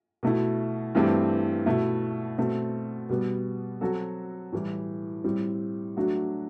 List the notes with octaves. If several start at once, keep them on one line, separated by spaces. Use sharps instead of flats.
B2 A3 E4
G2 E3 A3 C4 G4
B2 A3 E4
B2 A3 C4
B2 G3 B3
F#3 C4 F#4 A4
A2 E3 G3
A2 G3 C4
F#3 A3 D4 F#4